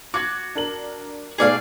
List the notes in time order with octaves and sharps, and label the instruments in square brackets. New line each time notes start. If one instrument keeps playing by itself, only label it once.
[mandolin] F#4 [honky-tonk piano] D6 G#6
[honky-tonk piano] D4 A#4 F#7
[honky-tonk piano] G#2 B2 A3 [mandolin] G#4 D5 F5